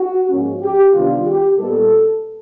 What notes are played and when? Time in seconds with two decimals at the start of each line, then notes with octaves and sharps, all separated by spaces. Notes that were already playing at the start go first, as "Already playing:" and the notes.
Already playing: F#4
0.30 G#2 F3 A#3 C#4
0.62 G4
0.94 C3 D#3 G3 B3 D4 F4
1.26 G4
1.59 A#2 G3 B3 D#4 A4